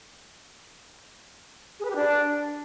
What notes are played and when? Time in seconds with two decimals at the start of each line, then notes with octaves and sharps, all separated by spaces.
1.80 G#4
1.85 B4
1.90 G4
1.96 D4